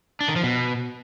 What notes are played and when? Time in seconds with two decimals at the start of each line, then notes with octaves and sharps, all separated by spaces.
0.20 D4
0.28 D#3
0.36 F3
0.44 B2